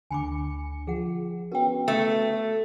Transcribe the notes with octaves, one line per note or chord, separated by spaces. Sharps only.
D2 D3 G#5 B5 D6 C#7
F3 G#4 F#5
B3 C#4 F#4 A#4 G5
A3